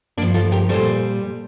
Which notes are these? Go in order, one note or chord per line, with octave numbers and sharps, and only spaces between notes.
G2 F3 A#3 D4
F4 A4
G4 A#4
A#2 G3 A4 C5